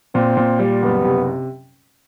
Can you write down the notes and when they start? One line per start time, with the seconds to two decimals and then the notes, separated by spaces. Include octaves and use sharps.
0.15 A#2 C4
0.37 A#2
0.59 G3
0.82 F#1 B3
1.04 C3